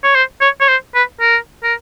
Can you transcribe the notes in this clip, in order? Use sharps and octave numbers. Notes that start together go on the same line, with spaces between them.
C#5
C5
C#5
C#5
C5
B4
A#4
A#4